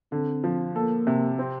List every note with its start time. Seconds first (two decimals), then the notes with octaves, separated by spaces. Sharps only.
0.12 D3 C4
0.44 F3
0.75 A#3 A4
1.07 C3
1.39 C4